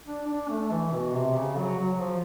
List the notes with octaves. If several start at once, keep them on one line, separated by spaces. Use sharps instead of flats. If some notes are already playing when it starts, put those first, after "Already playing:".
D4
D4
A3
E3
B2
C3
C#3
F#3
F#3
F3